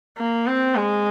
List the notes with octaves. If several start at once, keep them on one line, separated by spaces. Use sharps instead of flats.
A#3
C4
G#3